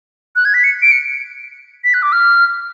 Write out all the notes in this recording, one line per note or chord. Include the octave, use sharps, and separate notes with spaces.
F#6
G#6
B6
C#7
D7
C#7
B6
F#6
D6
F6